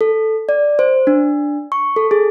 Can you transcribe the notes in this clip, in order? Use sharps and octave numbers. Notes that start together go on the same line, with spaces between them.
A4
D5
C5
D4
C#6
A4
G#4